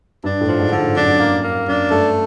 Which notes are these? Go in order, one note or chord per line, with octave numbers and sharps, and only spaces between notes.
G2 D4
A2
F3
G#2
D3
G#2
F#2 D4
F#2
A#3
A#3
F#2 D4
G2 A3